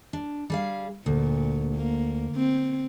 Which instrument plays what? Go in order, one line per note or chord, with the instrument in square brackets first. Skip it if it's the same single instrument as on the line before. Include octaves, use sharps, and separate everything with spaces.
[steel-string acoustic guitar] D4
G3 G#4 F5
[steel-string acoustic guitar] D2 [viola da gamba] A#2
[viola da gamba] A#3
C4